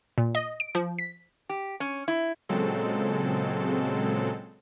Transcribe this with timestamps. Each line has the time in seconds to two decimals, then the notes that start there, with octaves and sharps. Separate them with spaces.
0.18 A#2
0.35 D#5
0.60 D7
0.75 F3
0.99 B6
1.49 G4
1.80 C#4
2.08 E4
2.49 A#2 C#3 F#3 G#3 C4 A4